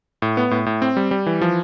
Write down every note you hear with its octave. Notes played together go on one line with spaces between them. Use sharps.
A2
B3
A2
A2
C4
G3
G3
E3
F3